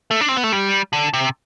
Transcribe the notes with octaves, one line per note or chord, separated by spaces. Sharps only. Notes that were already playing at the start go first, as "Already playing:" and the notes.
A3
D4
C4
B3
A3
G3
D3
C3